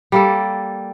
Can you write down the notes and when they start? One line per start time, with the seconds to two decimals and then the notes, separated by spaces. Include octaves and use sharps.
0.12 G3 A#3 A4